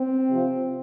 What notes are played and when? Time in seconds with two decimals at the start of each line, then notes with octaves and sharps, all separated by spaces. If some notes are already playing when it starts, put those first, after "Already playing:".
Already playing: C4
0.28 C3 F3